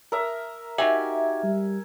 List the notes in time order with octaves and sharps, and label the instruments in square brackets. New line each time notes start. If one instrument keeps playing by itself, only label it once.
[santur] A#4 E5
[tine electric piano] D#4 F#4 G4 [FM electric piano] E5 [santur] G#5
[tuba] G3